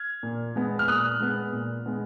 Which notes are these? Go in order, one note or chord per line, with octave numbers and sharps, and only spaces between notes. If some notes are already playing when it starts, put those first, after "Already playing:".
Already playing: F6 G#6
A#2
G#3 B3
F6
A#2 D#6 F#6
G#3 B3
A#2
G#3 B3